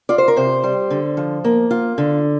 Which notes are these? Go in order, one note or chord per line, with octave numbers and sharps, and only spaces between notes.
F4 D5
C5
A#4
C3 C5
G3
D3
F3
A#3
F4
D3